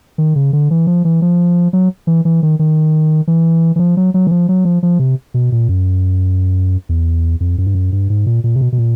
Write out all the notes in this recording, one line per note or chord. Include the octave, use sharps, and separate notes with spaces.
D#3
C#3
D3
E3
F3
E3
F3
F#3
E3
E3
D#3
D#3
E3
E3
F3
F#3
F#3
E3
F3
F#3
F3
F3
C3
B2
A#2
F#2
E2
F2
F#2
G2
F#2
G2
G#2
A#2
A#2
C3
B2
B2
A#2